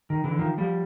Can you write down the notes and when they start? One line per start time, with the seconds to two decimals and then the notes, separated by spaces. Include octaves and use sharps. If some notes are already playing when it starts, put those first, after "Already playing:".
0.10 D#3
0.24 D3 E3
0.39 D#3 F3
0.58 F3 G3